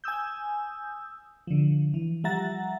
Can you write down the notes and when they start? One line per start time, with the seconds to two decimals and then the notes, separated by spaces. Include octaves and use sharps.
0.04 G#5 D#6 E6 G6
1.47 D3 F3
1.94 E3
2.24 F3 G3 E5 F#5 A#5 A6